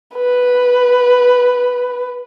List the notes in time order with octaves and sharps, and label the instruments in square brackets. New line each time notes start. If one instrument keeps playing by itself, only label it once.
[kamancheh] B4